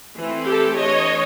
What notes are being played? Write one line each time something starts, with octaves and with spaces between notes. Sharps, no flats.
E3 A3 C4
G4 A4
E3 A3 D4 C#5 D#5